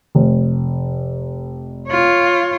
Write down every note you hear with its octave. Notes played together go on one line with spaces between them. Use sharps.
F1
F4 C#5